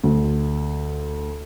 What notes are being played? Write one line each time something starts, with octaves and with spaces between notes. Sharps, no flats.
D2